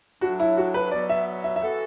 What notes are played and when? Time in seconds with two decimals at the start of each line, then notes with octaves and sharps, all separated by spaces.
0.21 A2 F#3 D4 F#4
0.40 E4
0.57 F#4
0.74 B4
0.91 B2 F#3 B3 D5
1.09 E5
1.44 E5
1.56 E5
1.62 E3 B3 F#4 A4 F#5